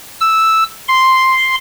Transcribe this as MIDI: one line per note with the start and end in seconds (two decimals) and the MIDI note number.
0.21 0.64 88
0.88 1.55 84